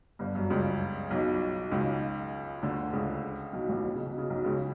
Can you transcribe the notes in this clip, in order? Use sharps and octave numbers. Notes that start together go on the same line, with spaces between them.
G1 G2
F#2
C#2 C#3
B1 B2
C#2 C#3
D2 D3
C#2 C#3
B1 B2
A1 A2
B2
C#3
B2
C#3
B1 B2
C#2 C#3